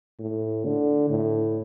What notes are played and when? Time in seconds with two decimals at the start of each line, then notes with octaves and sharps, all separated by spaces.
0.19 A2
0.65 D3
1.10 A2